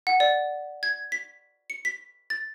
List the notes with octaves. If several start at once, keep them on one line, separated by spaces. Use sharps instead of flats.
F#5
D5
G#6
B6
C#7
B6
A6